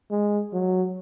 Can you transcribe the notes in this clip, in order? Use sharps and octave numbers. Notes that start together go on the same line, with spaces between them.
G#3
F#3